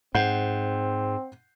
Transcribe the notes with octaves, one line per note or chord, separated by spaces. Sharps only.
G#2 C4 F#5 G6 C7